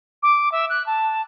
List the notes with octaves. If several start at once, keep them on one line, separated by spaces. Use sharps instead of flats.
D6
E5
F#6
A5